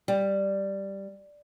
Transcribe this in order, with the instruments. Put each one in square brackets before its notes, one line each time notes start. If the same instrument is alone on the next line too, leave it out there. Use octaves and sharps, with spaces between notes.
[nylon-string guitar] G3